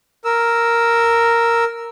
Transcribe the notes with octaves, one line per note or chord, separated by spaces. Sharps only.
A#4 E6